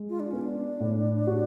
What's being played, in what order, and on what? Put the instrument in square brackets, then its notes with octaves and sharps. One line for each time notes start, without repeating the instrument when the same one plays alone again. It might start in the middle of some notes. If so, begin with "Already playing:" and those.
Already playing: [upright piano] G#3
[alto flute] F4
D4
[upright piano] B3 [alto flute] C#4
[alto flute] D4
[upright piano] A2
F#4